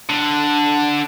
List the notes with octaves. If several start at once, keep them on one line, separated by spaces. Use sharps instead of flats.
D3